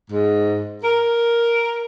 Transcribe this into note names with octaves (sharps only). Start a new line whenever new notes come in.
G#2
A#4